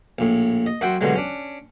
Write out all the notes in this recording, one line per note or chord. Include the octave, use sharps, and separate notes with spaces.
A#1 A2
D#5
F#2 F#4 E5 F#5 G5 C6
G2 B2 D3 F#3 G#3
C#4 D4